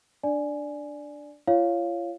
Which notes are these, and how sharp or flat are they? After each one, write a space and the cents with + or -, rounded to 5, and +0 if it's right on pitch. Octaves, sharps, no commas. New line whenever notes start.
D4 +0 D5 +0 G#5 +10
F4 -40 C#5 +0 F5 +0